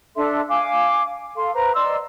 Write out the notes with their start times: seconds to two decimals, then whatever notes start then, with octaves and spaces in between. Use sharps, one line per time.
0.16 D4 A4 E5 C6
0.49 F5 G#5 D6
1.36 A4 F5 C6
1.54 B4 C5 A#5
1.75 D5 D#5 C6 E6